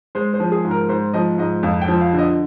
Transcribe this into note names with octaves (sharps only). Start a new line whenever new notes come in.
G#3 C5
C5
F3
G#4
G#2
A#4
G#2 C5
F3 D#5
G#2 D#5
F2 F5
G5
F3
F5
D3
D#5